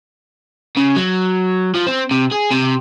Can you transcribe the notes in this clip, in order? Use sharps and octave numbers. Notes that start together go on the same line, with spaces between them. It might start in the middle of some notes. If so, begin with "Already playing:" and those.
C#3
F#3
F3
C4
C3
G#4
C3